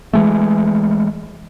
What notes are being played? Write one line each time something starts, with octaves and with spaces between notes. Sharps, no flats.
E3 G#3 A3